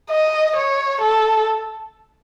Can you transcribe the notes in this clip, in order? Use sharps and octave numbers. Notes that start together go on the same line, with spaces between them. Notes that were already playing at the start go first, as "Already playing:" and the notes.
D#5
C#5
A4